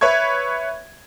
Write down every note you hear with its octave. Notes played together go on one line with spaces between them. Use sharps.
B4 C#5 E5 C#6 G#6